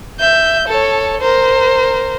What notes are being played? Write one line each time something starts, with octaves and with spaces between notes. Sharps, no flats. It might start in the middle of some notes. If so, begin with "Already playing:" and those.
E5 G6
A4 C#5
A#4 C5